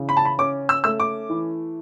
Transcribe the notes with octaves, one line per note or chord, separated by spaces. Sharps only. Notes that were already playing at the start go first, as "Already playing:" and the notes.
Already playing: C#3 E3
B5
A5
B5
C#4 D6
E6
A3 E6
D6
E3